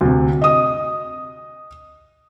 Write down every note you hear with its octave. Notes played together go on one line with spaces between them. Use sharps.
D2 C3
D#5 D#6